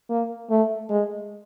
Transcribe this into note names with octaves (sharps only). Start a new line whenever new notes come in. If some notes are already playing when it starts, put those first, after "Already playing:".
A#3
A3
G#3